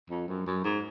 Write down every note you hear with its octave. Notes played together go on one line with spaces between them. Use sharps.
F2
F#2
F#2
G#2